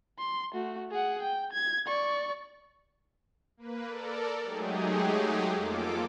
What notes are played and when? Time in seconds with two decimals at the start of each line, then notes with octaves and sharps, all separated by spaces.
0.19 C6
0.54 A3 F#4
0.91 G#4 F#5
1.22 G5
1.53 G#6
1.88 D5 C#6
3.57 A#3 B4
3.87 A4 A#4 D5
4.43 F#3 G#3 A3 D#4 G4 G#4
5.52 F2 A#3 F4 A4 D6